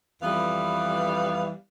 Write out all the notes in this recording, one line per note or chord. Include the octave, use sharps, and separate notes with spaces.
F2 E3 G3 B3 F5